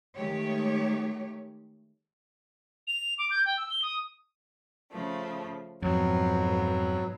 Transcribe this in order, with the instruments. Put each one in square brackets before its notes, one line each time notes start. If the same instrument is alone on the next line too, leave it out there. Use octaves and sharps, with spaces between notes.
[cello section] D#3 G#3 A3 G4 C#5
[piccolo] F7
D6
G6
G5
E6
G7
D#6
[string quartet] C#3 F3 A3
[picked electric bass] F2 [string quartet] G#2 B2 [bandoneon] F#3